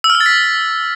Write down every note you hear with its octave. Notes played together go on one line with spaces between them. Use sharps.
E6
F6
E6
A6
B6